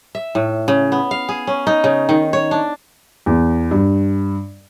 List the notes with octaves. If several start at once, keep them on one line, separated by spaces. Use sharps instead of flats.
E5
A2
C#3
B3
F5
G#4
C#4
D#4
C#3
D#3
C#5
D4
E2
G2